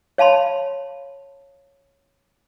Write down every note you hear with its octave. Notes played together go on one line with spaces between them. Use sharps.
C#5 F5 A5 B5 C6